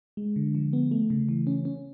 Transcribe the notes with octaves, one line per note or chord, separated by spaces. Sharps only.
G#3
D3
F3
B3
A3
C#3
E3
C#4
C#4